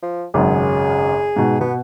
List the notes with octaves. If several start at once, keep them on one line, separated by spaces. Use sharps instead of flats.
F3
G#1 F#2 C#3 G#4
G#2 B2
B2 B3